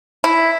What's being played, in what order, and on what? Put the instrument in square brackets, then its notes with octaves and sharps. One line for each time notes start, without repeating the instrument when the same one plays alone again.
[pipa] E4